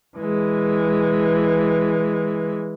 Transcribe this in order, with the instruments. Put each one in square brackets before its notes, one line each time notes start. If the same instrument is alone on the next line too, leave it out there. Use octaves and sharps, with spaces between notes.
[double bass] E3 G#3